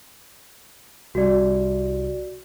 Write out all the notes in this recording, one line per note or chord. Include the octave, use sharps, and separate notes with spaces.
C2 G3 F#4 D5